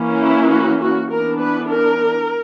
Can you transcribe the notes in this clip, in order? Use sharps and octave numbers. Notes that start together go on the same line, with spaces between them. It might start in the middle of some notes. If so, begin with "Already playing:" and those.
Already playing: E3 A#3 C#4
E4
F#4
F#4
E3 B3 D4 A#4
B4
A#4